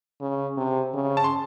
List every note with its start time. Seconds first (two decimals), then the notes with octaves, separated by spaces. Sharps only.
0.21 C#3
0.57 C3
0.94 C#3
1.17 A5
1.24 C6